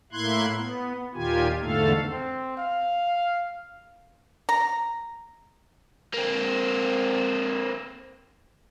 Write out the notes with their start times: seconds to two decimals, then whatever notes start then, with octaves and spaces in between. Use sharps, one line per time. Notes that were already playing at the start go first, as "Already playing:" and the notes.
0.13 A2 A#3 E4 C6 F#6 G#6
0.56 B3
1.15 D#2 A#2 D#3 F4 G4 G#5
1.62 E2 G#2 D3 A3 A4 F5
2.11 C4
2.57 F5
4.49 A#5
6.14 A#3 C4